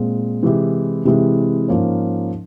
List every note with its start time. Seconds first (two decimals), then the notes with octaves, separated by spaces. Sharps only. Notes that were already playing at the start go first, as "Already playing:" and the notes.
Already playing: A#2 G#3 C4
0.42 C3 E3 G#3 E4 G4
1.05 C3 E3 G#3 E4 G4
1.68 G#2 F3 A#3 C#4